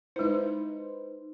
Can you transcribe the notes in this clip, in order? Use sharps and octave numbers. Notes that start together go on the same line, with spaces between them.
G#3 D#4 E4 B4 C5